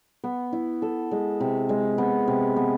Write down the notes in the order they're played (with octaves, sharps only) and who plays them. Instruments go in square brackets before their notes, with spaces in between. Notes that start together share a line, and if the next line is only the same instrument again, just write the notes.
[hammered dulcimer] B3
E4
A4
G#3
C3
G#3
B3
C3
B3